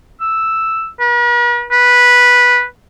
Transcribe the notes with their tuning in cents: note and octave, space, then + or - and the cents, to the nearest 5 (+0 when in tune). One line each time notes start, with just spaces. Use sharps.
E6 +0
B4 -45
B4 -10